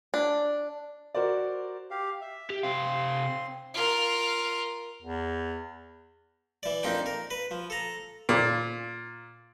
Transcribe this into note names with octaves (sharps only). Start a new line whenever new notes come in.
D4
F#4 A#4 C5 D5
G4 F5
E5
G4
C3 C4 F5 C6
F4 A#4
E2
E3 D5
F2 A#3 C4 D4 D#4 G5
A#4
B4
F3
A4 A#5
A#2